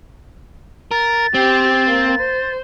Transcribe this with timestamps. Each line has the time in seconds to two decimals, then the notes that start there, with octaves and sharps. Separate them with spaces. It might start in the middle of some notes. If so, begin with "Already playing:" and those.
0.91 A#4 A6
1.34 C4 G4
1.87 A#3 C5
2.19 C5